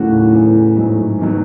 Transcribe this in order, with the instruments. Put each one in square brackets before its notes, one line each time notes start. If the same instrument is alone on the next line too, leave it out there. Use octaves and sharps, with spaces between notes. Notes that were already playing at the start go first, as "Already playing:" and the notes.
Already playing: [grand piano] D#2 C#3 F#3 C#4 F#4 [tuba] A2
[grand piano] E2 C#3 E3
G#2 F#3 A3
E2 D#3 F#3